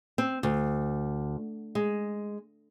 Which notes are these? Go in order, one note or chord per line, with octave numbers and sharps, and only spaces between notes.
C4
D2
G#3